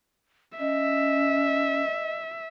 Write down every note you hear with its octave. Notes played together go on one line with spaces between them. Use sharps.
C#4 D#5 E5